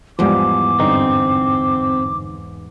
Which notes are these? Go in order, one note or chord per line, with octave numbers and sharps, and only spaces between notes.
E2 G#2 F3 G3 D6
G2 D3 C4 D#4